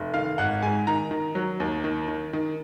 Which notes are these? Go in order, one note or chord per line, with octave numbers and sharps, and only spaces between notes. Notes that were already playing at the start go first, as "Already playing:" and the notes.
Already playing: F1
D#3 F5
G#1 F#5
G#2 G#5
D#3 A#5
D#3
F#3
D#2
D#3
D#3
D#3